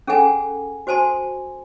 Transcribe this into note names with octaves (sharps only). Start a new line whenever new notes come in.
C#4 G#4 A4 F#5 G#5 A#5
F#4 C5 G#5 A5 C6